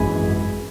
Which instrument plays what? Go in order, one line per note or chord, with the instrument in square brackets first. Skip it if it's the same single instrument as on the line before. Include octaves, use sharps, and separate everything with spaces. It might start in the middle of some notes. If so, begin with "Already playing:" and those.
Already playing: [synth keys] G#1 F#2 E3 G#3 G#5 B5